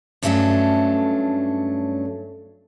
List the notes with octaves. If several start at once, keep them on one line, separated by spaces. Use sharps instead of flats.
G2 F#3 A3 C#4 D4 A4